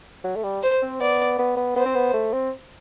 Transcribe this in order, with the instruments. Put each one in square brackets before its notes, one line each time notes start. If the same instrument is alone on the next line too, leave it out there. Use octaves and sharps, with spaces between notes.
[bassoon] F#3
A3
G3
[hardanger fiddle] C5
[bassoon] C4
[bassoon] B3 [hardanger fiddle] D5
[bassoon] B3
B3
[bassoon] B3 [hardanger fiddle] C5
[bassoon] C4
B3
A3
C4